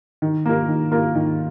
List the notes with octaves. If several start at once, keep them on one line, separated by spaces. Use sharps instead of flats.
D#3
A#3 F4 A#4
D#3
A#3 F4 A#4
D#3